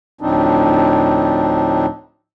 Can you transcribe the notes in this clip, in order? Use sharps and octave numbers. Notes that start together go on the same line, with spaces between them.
D2 A2 F3 C4 D4 D#4